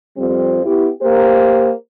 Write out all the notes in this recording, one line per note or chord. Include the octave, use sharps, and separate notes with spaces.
F2 F3 G3 C4
B3 E4 G4
A#3 G4 A#4 C5